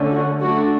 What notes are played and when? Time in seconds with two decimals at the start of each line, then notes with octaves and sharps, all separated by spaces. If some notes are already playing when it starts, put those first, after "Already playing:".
Already playing: D3 A3 C#4
0.11 F#4
0.41 F#3 A3 D4 F#4